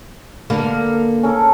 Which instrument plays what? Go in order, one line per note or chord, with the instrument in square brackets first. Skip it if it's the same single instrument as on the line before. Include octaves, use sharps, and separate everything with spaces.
[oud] D3 A#3 B3
[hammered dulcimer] C#4 A4 A#4